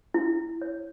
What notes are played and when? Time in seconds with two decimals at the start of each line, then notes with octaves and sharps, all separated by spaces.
0.14 E4
0.62 C#5